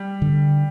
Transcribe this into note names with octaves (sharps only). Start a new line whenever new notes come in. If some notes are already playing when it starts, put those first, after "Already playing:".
Already playing: G3
D3